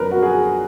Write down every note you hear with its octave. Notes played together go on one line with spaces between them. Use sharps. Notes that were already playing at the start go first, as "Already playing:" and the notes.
Already playing: F#2 D3 F3 B3 D4 A#4 B4
F#4
G#4